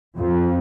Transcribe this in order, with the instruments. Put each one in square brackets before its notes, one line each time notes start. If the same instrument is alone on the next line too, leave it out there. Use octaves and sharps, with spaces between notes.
[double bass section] F2